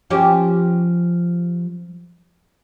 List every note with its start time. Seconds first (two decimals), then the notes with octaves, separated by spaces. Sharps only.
0.10 F3 C#4 G4